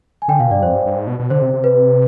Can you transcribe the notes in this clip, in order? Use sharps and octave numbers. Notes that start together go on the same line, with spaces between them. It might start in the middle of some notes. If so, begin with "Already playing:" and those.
G#5
D3 G5
B2 F5
G2 D5
F2 C5
G2
G2
G#2
B2
B2
D3 C5
C3
C3
B4